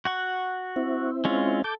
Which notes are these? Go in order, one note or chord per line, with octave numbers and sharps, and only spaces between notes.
F#4 F#5 C#6
C4 E4
G#3 C#4 F4
A4 D6 G6